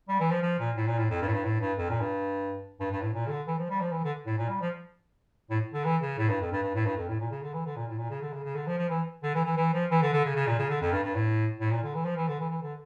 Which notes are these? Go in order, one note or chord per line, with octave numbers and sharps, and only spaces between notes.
G3
E3
F3
F3
A#2
A2
A#2
A2
F2
G2
A2
G2
A2
G2
F2
A#2
G2
G2
G2
A2
A#2
C#3
D3
E3
F3
G3
F3
E3
D3
A2
A#2
G3
F3
A2
D3
E3
C#3
A2
G2
F2
G2
G2
A2
G2
F2
A2
A#2
C#3
D3
E3
D3
A#2
A2
A#2
C#3
D3
C#3
C#3
D3
F3
F3
E3
D3
E3
E3
E3
F3
E3
D3
D3
C#3
C#3
A#2
C#3
D3
F2
G2
G2
A2
A2
A#2
D3
E3
F3
E3
D3
E3
E3
D3